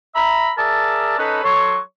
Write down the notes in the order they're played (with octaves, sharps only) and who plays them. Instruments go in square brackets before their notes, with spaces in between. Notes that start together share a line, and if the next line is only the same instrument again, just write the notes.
[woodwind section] E5 A#5 B5
G#4 A#4 D5 E5 A5
C#4 D#4 A4 B4
F#3 A4 C#5 C6 C#6